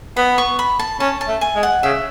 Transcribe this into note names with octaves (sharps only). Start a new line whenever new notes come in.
B3 B5
C#6
B5
A5
C#4 A5
A5
A3
G#5
G#3
F#5
C#3 E5